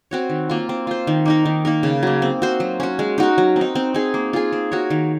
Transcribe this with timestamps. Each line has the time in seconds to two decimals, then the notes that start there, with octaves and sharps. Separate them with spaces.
0.11 C4 F#4 C#5
0.30 D#3
0.49 A#3 F4
0.69 C4
0.87 F4 C5
1.07 D#3
1.26 A#3 D#4 A#4
1.45 D#3
1.65 A#3 D#4 A#4
1.83 C#3
2.03 F#3 A#3
2.22 C4
2.42 F#4 C5
2.60 F#3
2.80 C#4 F#4
2.99 G#3
3.18 D#4 F#4 A#4
3.38 F#3
3.56 C4
3.61 D#4
3.75 C4
3.94 D#4 G#4
4.14 A#3
4.33 F4 G#4
4.52 C4
4.72 F#4 A#4 C#5
4.90 D#3